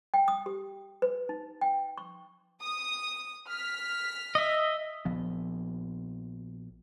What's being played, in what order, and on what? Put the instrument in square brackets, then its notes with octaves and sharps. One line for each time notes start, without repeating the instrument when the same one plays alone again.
[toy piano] G5
D#6
G4
B4
D#4
G5
C#6
[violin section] D#6
F6 B6
[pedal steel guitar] D#5 E5
[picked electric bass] A#1 F3 B3